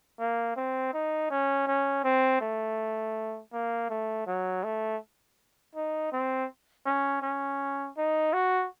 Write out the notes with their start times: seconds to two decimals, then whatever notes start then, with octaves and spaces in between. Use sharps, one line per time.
0.19 A#3
0.56 C4
0.93 D#4
1.30 C#4
1.67 C#4
2.04 C4
2.41 A3
3.53 A#3
3.90 A3
4.27 F#3
4.64 A3
5.75 D#4
6.12 C4
6.86 C#4
7.22 C#4
7.97 D#4
8.33 F#4